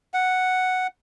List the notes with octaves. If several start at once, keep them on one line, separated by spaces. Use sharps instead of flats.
F#5